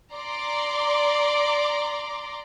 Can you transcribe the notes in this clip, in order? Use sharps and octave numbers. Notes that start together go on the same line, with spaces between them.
D5 A#5 C6 D6